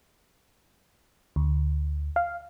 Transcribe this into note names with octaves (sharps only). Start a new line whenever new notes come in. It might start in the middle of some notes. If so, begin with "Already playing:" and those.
D2
F5